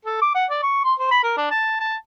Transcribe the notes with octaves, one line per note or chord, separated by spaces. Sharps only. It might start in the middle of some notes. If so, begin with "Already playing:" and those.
A4
D6
F#5
D5
C#6
C6
C5
B5
A#4
D4
A5
A5